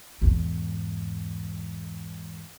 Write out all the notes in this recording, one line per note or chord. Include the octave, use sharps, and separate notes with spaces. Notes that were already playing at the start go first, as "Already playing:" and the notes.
E2 G#2